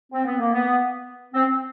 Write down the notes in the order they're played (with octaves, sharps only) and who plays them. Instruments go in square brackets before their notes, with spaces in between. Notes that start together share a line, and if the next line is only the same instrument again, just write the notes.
[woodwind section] C4
B3
A#3
B3
C4